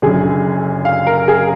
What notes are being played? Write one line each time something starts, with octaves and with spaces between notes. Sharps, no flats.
F#1 F#2 D3 G#4
F5
A#4
G#4